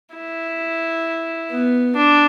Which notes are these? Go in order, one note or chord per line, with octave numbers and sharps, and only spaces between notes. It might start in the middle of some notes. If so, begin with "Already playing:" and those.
E4
B3
D4